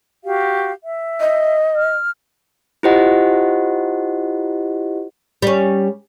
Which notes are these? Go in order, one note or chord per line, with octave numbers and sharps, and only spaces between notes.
F#4 G4 F5
E5
D#5
F6
E4 F4 G4 C5 D#5 F#5
G3 C#4